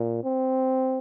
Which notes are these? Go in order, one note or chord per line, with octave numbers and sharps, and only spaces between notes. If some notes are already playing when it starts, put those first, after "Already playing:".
Already playing: A#2
C4